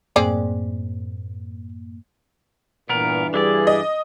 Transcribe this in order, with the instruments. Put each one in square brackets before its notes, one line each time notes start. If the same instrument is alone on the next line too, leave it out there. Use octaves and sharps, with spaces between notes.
[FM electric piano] F#2 A2 A#3 [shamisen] C4 G#4 D5
[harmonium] G2 E3 [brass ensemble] A#2 [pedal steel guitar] B3 A#4
[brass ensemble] G3 G#4 [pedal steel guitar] D4 E4 D5
[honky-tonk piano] D#5